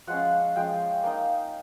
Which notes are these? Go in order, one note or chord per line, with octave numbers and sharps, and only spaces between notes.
F3 G#3 C#4 F#5
F3 G#3 C#4 G5
A#3 D#4